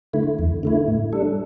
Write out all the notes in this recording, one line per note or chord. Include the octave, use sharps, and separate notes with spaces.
D3 A3 E4
E2
D3 A3 E4
A2
G3 D4 A4